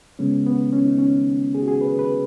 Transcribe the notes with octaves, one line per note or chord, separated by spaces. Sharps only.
C#3 G#3 B3 C#4
B3
C#4
D#4
C#4
G#4
F#4
G#4
B4
B4